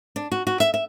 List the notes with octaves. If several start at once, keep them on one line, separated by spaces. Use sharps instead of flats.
D4
F#4
F#4
E5
E5